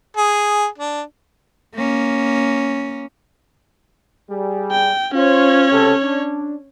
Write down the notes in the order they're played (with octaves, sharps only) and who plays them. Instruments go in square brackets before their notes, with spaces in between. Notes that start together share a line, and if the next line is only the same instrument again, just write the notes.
[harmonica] G#4
D4
[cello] A#3 C#4
[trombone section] G3 G#4
[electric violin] G5
[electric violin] C#4 C#5 [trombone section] F4 C5
[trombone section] C#2 C3 A4
D4